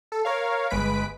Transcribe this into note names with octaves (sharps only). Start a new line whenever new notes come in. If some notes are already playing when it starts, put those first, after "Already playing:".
A4
A#4 C#5 F5
G1 G#3 B4 B6 D7